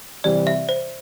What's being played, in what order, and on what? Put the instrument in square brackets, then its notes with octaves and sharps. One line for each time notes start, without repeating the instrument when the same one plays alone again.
[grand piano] C3 E3 G3 C4 [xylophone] D5
[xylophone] E5
C5